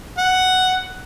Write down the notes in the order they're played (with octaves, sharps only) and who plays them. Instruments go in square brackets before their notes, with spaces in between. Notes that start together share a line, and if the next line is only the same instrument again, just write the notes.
[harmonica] F#5